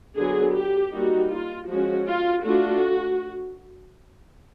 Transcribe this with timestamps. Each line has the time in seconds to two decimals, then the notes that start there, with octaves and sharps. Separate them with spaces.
0.16 D3 F#3 B3 G#4
0.54 G4
0.93 G3 A#3 D#4 F#4
1.31 F4
1.69 F3 G#3 C#4 F#4
2.08 F4
2.45 A3 D4 F4 F#4